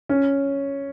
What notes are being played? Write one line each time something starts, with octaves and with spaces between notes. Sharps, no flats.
C#4